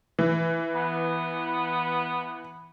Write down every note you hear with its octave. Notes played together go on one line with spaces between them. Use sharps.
E3
B3